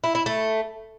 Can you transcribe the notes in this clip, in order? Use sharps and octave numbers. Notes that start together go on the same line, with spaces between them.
E4
E4
A3